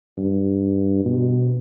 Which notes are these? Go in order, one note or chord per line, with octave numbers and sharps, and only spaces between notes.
G2
B2